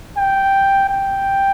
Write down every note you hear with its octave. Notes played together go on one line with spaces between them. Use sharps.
G5
G5